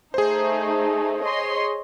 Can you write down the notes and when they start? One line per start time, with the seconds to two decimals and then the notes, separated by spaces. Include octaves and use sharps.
0.14 A3 D#4 G#4 C5
1.22 C#5 D#5 C6